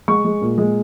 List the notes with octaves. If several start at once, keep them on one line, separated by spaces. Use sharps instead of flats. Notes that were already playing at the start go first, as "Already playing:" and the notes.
G#3 C#6
G#3
A#2
G#3